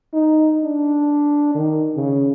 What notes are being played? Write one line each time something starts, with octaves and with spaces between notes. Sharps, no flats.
D#4
D4
D#3
C#3